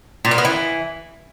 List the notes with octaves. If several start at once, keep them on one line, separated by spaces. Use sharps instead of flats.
A#2
A#3
B3
E3